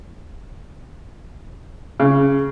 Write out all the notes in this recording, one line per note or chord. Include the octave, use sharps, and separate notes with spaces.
C#3